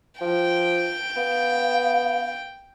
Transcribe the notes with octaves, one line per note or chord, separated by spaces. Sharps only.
F3 G5
B3 F5